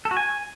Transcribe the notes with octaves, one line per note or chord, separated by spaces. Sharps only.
A4
F#4
G#5